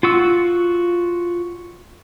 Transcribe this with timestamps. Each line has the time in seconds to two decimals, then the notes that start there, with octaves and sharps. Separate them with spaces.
0.03 F4 F#4 E6